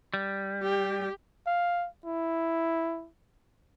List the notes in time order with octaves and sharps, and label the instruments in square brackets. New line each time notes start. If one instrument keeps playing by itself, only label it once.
[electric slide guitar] G3
[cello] G4
[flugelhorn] F5
E4